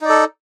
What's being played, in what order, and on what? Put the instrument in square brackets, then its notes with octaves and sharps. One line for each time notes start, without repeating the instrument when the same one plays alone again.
[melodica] D#4
D5
A4